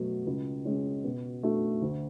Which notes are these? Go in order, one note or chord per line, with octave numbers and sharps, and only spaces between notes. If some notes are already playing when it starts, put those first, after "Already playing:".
Already playing: B2 F#3 A3
C#2
C#3 G#3 C#4
B2
A3 D4 F#4
D2